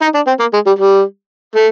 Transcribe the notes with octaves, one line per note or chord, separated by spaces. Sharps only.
D#4
D4
C4
A#3
G#3
G3
G3
A3